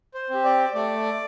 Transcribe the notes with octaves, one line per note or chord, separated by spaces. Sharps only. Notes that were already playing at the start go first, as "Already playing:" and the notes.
C5
C4 G4
D5
A3 D5